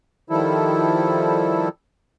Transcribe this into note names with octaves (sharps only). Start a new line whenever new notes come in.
D#3 F3 G3 E4 A4